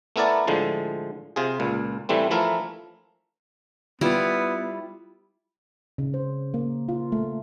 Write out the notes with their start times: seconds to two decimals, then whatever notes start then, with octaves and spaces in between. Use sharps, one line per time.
0.16 A3 B3 E4 A#4 D5 A5
0.47 A2 D3 F3 G#3
1.36 C3 F4 G#4
1.60 C#2 A#2
2.09 A2 E3 G3 A3 C4
2.31 E3 F3 A3 E4 A#4
4.01 G3 B3 E4 F4
5.98 C#3
6.14 C5
6.54 A#3
6.89 F4
7.12 A3